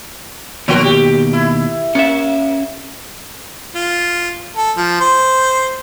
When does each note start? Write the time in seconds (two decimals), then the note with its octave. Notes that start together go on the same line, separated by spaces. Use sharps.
0.68 D#2 B2 F3 F#4 A#4 G5
0.84 G4
1.33 E4
1.95 A#3 C#4 E5
3.75 F4
4.56 A4
4.77 F3
5.00 C5